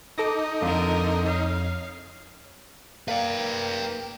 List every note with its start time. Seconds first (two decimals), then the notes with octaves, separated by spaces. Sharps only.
0.18 D#4 A4 D6 A#6
0.62 F2 D3 F4 A#4
1.25 C#5 F5
3.08 A#3 B4 D5 F5 G5